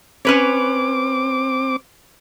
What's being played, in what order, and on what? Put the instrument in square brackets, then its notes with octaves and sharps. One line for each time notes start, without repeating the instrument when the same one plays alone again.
[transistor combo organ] C4 D6 [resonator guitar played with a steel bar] C#4 B4 C#5